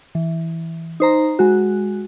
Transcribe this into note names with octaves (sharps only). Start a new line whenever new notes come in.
E3
D#4 C5 A#5
G#3 F#4